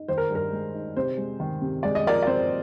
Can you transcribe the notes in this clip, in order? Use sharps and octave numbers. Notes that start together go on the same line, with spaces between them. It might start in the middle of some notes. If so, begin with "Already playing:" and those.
Already playing: D#4
D#3 C5
A#4
G2
A#4
G#3
D#4
C3 C5
G#3
D#3
C3
G#3 D5
D#5
F3 A#4 D5
D5
C4 C5